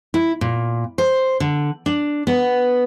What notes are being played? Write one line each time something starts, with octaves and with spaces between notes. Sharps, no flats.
E4
A#2
C5
D3
D4
B3